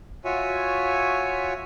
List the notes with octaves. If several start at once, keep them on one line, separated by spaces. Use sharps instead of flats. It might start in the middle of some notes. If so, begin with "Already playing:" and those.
F4 F#4 C#5 E5 G#5